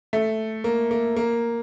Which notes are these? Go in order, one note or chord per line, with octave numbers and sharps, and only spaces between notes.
A3
A#3
A#3
A#3